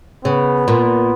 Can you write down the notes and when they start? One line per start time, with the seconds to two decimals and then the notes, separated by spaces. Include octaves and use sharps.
0.24 C#3 B3
0.68 A#2